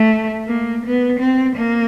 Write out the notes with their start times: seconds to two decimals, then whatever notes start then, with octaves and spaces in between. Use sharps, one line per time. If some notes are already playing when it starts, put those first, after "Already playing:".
Already playing: A3
0.48 A#3
0.85 B3
1.20 C4
1.57 A#3